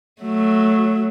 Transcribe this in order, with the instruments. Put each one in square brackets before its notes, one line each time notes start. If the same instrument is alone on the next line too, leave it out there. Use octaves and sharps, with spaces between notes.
[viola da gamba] F#3 A3